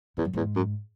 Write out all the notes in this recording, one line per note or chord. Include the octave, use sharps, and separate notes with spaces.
E2 G#2
F#2
E2 G#2
F#2